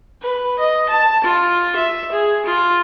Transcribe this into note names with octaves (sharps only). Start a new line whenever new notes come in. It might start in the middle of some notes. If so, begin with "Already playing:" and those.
B4
D#5
A5
F4
E5
G#4
F4